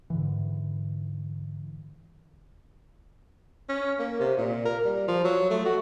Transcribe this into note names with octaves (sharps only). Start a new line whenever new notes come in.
G#2 D3 E3
C#4
A#3
C3
A#2
A#4
G3
F3
F#3
A3
F#4